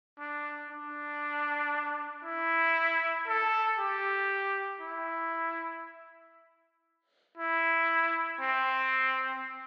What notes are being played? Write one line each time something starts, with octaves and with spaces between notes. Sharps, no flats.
D4
D4
E4
A4
G4
E4
E4
C4